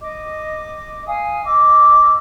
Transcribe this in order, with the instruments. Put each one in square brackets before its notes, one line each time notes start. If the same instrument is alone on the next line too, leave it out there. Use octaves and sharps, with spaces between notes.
[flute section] D#5 D6
F5 G#5 D#6
D#5 D6 E6